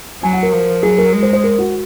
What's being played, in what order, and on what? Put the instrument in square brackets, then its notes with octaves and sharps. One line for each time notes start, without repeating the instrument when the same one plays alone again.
[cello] F#3 [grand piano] G#5
[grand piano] F#5
A#4
[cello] F3
[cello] F#3 [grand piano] G#4
[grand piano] A#4
[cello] G#3 [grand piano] A#4
[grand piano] C5
C5
A#4
F#4